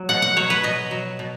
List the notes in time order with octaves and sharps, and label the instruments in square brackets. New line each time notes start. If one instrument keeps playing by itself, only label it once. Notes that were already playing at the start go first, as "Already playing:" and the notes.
Already playing: [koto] F#3
B2 F#5
F#5
F#3 C#5
B4
B2 D#5
F#3
B2